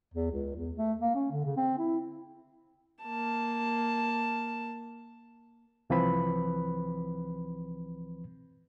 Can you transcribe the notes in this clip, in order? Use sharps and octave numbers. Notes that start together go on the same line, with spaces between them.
E2
C#2
E2
A3
A#3
C#4
D3
C#3
C4
E4
A#3 A5
C2 E3 F3 C4 B4 B5